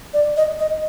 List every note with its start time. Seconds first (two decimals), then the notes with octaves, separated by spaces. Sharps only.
0.14 D5
0.37 D#5
0.59 D#5